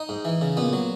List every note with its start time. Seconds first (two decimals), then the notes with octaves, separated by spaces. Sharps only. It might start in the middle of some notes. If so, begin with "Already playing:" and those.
Already playing: D#4
0.09 G#2
0.25 E3
0.41 C#3
0.57 A#2 B3
0.73 F#3